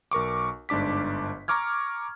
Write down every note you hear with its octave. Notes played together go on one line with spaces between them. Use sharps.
B1 A#4 C#6 D6
G1 G#2 D4 D6 B6
A#5 C#6 D6 F6 G#6